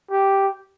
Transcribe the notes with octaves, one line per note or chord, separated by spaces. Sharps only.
G4